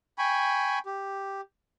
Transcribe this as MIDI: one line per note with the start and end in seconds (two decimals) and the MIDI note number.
0.18 0.79 79
0.18 0.79 80
0.18 0.79 83
0.18 0.79 85
0.86 1.41 67